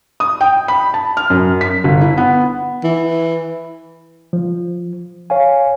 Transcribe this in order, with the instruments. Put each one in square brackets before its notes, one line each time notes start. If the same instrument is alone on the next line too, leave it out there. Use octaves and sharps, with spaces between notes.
[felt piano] D#6
G5
B5
A5
F6
F#2
B6
G1
E4
B3
[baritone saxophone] E3
[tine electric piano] F3
C#5 F5 G#5